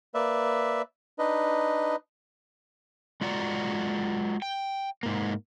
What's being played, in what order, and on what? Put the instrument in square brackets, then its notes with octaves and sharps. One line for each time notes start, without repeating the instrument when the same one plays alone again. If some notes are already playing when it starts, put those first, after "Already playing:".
[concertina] A#3 B4 D5 E5
D4 D#4 B4 D#5
[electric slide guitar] G#3 F4 F#4 D5 A#5
G5
G#2 A#3